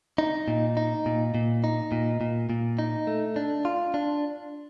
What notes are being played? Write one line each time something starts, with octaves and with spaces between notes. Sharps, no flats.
D#4
A#2
D#4
A#2
A#2
D#4
A#2
A#2
A#2
D#4
A3
D4
F4
D4